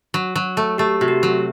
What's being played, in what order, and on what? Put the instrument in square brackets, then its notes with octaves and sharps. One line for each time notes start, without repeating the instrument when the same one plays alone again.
[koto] F#3
F#3
A3
[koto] A3 [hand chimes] G4
[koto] C3 [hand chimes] F#4
[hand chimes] G4
[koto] F#3